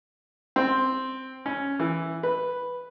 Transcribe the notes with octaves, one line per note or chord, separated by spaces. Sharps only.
C4
C#4
E3
B4